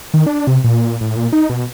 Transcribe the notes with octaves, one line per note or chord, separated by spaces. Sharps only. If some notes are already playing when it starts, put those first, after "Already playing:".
D#3
D4
C3
A#2
A2
A#2
D#4
B2